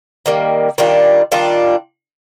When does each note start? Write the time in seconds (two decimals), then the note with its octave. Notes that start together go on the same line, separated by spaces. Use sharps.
0.26 D#3 G3 A#3
0.78 D#3 G3 D4 F4
1.32 D#3 G3 D4 F4